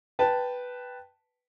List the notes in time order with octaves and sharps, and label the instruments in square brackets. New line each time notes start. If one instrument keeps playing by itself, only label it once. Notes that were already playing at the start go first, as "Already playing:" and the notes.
[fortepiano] B4 G5 A5